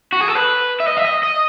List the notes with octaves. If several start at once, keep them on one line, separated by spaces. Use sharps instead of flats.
F#4
G#4
A4
B4
E5
D#5
E5
D#5
D#5